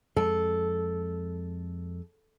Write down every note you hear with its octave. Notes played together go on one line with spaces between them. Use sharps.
F2 G#3 A4